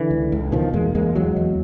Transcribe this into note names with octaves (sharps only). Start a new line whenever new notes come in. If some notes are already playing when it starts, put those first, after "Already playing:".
Already playing: D3 E3
C#2
C#2
B2 D#3 F3
E2 G#3 A#3
E2 G#3 A#3
E2 F#3 G#3
E2